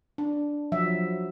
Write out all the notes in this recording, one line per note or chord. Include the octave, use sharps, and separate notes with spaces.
D4
F3 F#3 E5